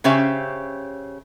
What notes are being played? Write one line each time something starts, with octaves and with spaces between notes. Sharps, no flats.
C#3 C#4 G4 C5 E5